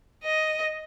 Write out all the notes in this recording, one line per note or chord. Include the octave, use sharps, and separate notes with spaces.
D#5